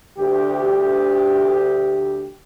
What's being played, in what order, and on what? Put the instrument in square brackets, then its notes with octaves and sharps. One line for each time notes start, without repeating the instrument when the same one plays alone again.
[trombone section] D2 G4